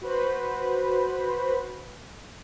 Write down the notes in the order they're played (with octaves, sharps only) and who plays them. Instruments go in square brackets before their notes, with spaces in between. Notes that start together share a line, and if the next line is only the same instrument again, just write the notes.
[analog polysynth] F#4 B4 C5 B5